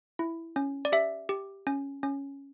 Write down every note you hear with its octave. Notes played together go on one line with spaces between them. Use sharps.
E4
C#4
D5
G4 E5
G4
C#4
C#4